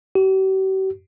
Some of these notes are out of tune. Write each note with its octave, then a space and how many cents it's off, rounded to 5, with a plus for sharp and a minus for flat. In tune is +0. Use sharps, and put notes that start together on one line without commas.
G4 -45